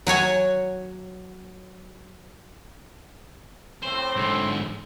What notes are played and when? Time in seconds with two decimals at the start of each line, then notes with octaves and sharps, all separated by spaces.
0.07 F#3 F#4 C#5 G#5
3.83 A2 C4 C5
4.16 G#2 D3